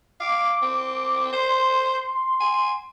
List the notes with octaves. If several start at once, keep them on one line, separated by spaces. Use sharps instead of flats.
F5 D6
C4
C5 C6
G#5